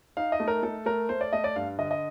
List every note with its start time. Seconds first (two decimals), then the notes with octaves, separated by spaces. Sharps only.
0.17 D#4 F5
0.32 D#5
0.40 A3
0.48 A#4
0.63 A3 A4
0.86 A3 A#4
1.09 A3 C5
1.21 D5
1.33 A3 D#5
1.44 D5
1.56 G2 F5
1.78 D3 D#5
1.91 D#5